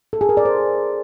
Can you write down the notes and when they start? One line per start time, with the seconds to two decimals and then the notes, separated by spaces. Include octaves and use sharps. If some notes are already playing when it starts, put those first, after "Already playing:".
0.13 A4
0.21 G#4
0.29 A#4
0.37 D5
0.45 C5